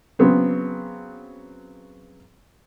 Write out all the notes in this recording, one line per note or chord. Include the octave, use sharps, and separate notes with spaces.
C#3 F#3 B3 C4